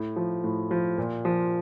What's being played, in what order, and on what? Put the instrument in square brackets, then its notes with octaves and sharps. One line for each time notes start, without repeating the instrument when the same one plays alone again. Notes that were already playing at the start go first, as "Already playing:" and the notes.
Already playing: [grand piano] A2
F3
A2
F3
A#2
F3